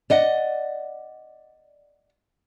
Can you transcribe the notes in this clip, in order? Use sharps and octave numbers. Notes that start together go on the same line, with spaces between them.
D5 D#5 F#5